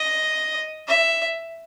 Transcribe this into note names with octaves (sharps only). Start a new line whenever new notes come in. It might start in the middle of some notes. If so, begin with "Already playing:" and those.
Already playing: D#5
E5